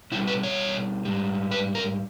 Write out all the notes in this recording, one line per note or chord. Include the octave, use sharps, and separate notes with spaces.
B2 G3 E4
B4
C#5
G#2 G3
B4
A#4